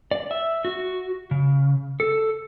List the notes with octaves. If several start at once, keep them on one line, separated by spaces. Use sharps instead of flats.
D5
E5
F#4
C#3
A4